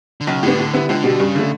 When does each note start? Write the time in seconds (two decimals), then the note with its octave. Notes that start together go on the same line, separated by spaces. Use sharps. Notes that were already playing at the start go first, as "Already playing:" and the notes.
0.21 D3
0.27 B1 C#3
0.43 A2 D3 G3 B3
0.59 A2
0.73 G3 B3 E4 B4
0.89 C#2 D3
1.04 B2 G3
1.19 G2 C#3
1.35 D3 A3